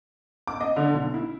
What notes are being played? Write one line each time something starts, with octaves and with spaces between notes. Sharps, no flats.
D6
D#5
D3
B1
E4